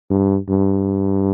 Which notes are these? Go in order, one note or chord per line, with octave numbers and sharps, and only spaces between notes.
G2
G2